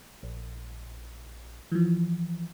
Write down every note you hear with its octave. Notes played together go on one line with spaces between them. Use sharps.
A#1
E3 F3